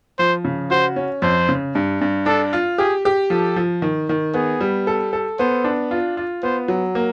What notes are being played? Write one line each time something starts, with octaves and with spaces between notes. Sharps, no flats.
F3 C5
C#3
F#4 C5
C#4
F2 C5
C#3
G2
G2
D4 A4
F4
G4 G#4
G4
F3 A4
F3
D#3
D#3
B3 G#4
G3
A4
A4
B3 C5
D4
F4
F4
B3 C5
F#3
A#3